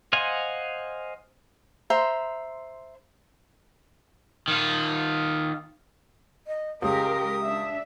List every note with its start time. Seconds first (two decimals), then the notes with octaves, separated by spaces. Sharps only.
0.13 C5 D#5 F5 F#5 G#5
1.90 C5 E5 A#5 C6
4.48 D#3 F4
6.47 D#5
6.82 C#2 G#3 G4 A#4 D#6
7.41 D4 E5